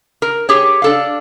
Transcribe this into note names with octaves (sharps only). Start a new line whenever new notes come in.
A#4
G4 G#4 C#5
D4 A4 F5